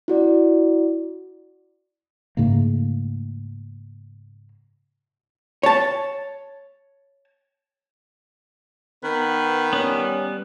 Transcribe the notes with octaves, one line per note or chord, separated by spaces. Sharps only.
E4 F#4 D5
G#2 C#3 A3 A#3
C#5 A5
D#3 B3 B4
G3 B3 C#4